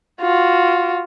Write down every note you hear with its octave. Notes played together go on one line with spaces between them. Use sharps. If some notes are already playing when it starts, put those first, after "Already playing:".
F4 F#4